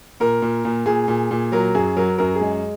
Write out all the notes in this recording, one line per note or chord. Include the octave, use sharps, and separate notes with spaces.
A#2 A#4
A#2
A#2
A#2 G#4
A#2
A#2
F#3 A#4
F#2 G#4
F#3 A#4
F#2 A#4
G#4
G#3